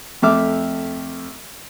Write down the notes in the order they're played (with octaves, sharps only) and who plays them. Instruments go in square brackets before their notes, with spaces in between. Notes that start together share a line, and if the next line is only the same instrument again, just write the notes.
[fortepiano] F2 A3 E5 D6 F6